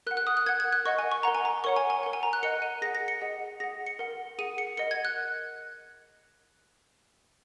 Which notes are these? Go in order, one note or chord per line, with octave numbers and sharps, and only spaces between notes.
A#4 F#5 F#6
F#6
D#6
F#6
A#4 F#5 G#6
G#6
F#6
A#4 D#5 F#5 C#6
G#5
C#6
A#4 F#5 A#5
G#5
A#5
A#4 C#5 F#5 C#6
G#5
G#5
A#4 F#5
G#5
A#5
F#6
A#4 D#5 F#5 C#7
D#7
G#4 F#5 A#6
A#6
C#7
G#4 D#5 F#5
G#4 F#5 A#6
C#7
A#4 F#5
G#4 F#5 D#7
C#7
A#4 D#5 F#5 C#7
G#6
F#6